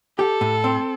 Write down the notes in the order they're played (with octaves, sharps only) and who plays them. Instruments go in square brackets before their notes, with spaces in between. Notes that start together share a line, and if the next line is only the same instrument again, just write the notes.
[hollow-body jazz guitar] G4 [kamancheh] A4
[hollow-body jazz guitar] A2
C4